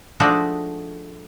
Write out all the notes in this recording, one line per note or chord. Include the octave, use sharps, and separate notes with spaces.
F3 G#3 A3 D4 D#4 F#4